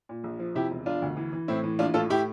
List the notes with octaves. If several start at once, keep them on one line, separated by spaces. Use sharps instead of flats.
A#2
A#1
F3
C3 E4 G4
E1
E1 D4 F4
D2
E3
E3
A2 C4 E4
E3
A#1 D4 F4
A2 F4 A4
A2 E4 G4